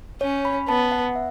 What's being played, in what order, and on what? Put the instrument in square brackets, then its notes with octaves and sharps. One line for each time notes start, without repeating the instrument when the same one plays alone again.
[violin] C#4 [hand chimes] C#5
[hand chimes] B5
[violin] B3 [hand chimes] A5
[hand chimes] F#5
E5